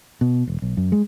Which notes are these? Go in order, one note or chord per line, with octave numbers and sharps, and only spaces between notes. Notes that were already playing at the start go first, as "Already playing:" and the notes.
B2
E1
B1
F#2
G#3